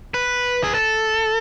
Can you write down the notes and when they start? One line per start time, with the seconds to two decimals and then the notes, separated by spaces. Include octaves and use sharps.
0.14 B4
0.64 G#4
0.74 A4